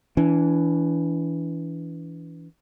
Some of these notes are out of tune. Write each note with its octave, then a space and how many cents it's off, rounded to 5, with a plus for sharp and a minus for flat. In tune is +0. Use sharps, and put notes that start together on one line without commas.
E3 +0 D4 -40